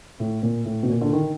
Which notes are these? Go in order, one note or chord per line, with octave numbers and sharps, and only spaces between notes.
A2
A#2
A2
B2
A#2
D3
D#3